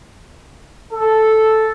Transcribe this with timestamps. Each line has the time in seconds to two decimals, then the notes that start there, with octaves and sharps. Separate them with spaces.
0.92 A4